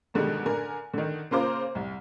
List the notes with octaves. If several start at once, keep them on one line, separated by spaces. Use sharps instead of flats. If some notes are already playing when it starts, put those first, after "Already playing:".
G#2 B2 D3 D#3 G3 G#3
D3 A#4 G#5
D3 D#3
C#3 A#3 F4 C5 A#5 D6
C2